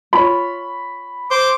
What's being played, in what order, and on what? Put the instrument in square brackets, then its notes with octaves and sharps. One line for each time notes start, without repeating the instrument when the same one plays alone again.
[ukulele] F4 C#5 [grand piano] B5
[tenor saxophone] C5 [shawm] D6